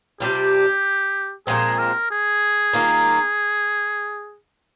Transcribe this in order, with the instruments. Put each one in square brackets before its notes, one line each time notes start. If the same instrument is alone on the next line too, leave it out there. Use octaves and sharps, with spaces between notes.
[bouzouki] C3 G3 D4 F4 [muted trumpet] G4
[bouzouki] A#2 F3 G#3 C4 [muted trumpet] G#4
[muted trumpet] A#4
G#4
[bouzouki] D#3 A#3 F4